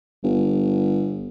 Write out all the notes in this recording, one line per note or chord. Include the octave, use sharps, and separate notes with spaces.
G1